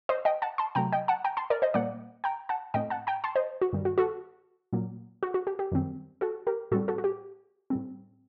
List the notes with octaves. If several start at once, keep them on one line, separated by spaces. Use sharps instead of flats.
C5 D#5
D#5 G5
F#5 A5
A5 C6
C3 F#3 A3 G5 A#5
D#5 G5
F#5 A5
G5 A#5
A5 C6
A#4 D5
C5 D#5
A#2 G3 A#3 D5 F#5
G5 A#5
F#5 A5
A2 A3 C4 D#5 G5
F#5 A5
G5 A#5
A5 C6
C5 D#5
F#4
G2 D#3 G3
F#4
F#4 A4
A#2 F#3 A#3
F#4
F#4
G4
G4
F#2 D#3 G3 C4
F#4 A4
G4 A#4
A2 G3 C4 F#4 A4
F#4 A4
F#4
G4
A2 G3 C4